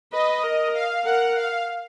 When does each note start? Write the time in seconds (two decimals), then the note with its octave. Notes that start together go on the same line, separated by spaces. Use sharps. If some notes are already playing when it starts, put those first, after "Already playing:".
0.12 B4 D#5
0.43 A#4
0.74 F5
1.04 A#4 F#5
1.36 F5